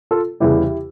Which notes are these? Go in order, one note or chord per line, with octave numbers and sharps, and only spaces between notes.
F4 A4
E2 C#3 E3 G3 E4 G4